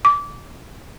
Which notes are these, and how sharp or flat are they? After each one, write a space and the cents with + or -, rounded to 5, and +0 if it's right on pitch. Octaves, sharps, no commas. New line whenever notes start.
D6 -20